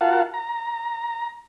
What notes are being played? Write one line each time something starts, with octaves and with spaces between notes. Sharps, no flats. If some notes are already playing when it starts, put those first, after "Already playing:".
F4 F#4 A#4 F5 F#5 A5
A#5